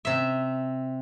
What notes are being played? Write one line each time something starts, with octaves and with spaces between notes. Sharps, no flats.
C3 E5